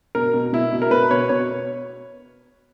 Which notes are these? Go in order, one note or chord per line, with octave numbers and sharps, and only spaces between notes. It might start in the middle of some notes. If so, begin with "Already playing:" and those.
B2 A#4
B2
B2 E4
B2
A#4
B2 B4
B2 C#5
B2 C#5